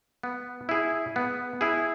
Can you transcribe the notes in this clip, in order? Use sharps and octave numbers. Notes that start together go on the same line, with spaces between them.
B3
E4 G#4
B3
E4 G#4